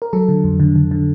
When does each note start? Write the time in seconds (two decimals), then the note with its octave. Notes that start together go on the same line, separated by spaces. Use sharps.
0.02 A#4
0.13 F#3 A4
0.29 D3
0.44 F2
0.60 D3
0.76 D3
0.91 D3